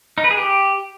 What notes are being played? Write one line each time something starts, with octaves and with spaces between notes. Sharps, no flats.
D#4
B4
G#4
G4